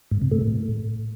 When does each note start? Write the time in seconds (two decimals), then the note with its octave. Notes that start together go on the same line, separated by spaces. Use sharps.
0.11 G#2
0.21 C3
0.31 A3
0.41 A2